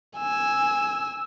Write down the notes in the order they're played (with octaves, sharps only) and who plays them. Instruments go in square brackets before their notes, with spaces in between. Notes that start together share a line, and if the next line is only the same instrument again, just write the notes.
[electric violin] G#5 E6